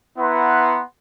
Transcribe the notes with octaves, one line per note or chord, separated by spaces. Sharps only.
B3 E4 B4 F#5 A#5 C6